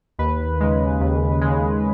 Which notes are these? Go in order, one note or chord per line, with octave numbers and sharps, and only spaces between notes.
D#2 B4
C#3 G#3
D#2
C#3 G#3